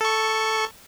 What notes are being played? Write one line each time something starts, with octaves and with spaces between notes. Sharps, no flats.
A4 C#6